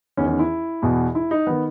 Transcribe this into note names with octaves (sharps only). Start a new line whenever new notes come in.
E2 D#3 C#4
C#4
E4
E2 B2
E4
D#4
D#3 B3